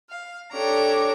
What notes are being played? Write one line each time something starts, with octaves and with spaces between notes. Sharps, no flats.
F5
D4 G4 A4 C#5 A#5